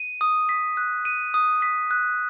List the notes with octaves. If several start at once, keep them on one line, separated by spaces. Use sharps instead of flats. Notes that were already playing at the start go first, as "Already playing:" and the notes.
Already playing: D#7
D#6
B6
F#6
D#7
D#6
B6
F#6